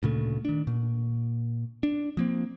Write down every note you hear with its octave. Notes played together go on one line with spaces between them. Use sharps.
D2 A#2 C#3 A3
D#3 D4
A#2
D4
F3 A#3 C4